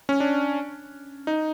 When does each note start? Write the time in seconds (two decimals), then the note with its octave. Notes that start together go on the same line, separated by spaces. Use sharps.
0.09 C#4
0.20 D4
1.27 D#4